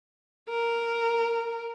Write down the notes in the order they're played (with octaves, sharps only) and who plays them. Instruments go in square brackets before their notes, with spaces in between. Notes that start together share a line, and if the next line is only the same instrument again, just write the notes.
[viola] A#4